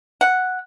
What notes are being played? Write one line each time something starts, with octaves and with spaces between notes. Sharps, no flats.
F#5